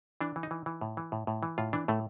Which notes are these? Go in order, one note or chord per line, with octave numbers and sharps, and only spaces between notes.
E3 D4
E3
D#4
E3
E3
A2
E3
A2
A2
E3
A2 F4
E3 D4
A2 A3